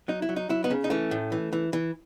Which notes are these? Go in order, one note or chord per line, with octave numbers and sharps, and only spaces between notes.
F#3 D#4
E4
F#3
D#4
F#3 E4
B3 D#4
C#3
D#4
E3 A3 C#4
A2
E3
E3
E3